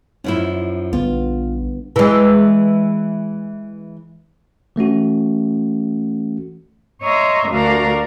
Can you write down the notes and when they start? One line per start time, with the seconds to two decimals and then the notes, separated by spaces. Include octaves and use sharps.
0.24 F#2 F3 D#4 E4
0.93 A#1 D3 G3 B3 F4
1.96 E3 G#3
4.76 E3 A3 C#4 F#4
7.02 C#5 D#5 E5 A#5 C6
7.49 D2 D3 F#4 A#4 D5 F5